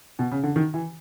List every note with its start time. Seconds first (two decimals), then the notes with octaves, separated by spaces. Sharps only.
0.19 B2
0.31 C#3
0.43 D3
0.56 D#3
0.74 E3